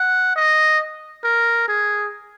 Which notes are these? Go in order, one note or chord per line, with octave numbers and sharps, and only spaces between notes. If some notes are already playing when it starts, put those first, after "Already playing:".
Already playing: F#5
D#5
A#4
G#4